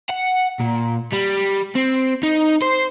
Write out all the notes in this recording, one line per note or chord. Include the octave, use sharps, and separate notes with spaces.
F#5
A#2
G3
C4
D#4
C5